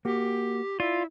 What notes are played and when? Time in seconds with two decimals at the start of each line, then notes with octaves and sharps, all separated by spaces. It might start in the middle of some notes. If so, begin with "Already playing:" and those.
0.05 A#3 F#4 G4
0.80 E4 F4 D5